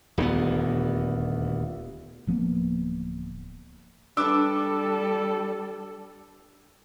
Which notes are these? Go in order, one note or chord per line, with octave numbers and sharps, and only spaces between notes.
D#1 D2 G#3 B3
D1 F3 A#3 B3
G3 D4 A4 B4 D6 E6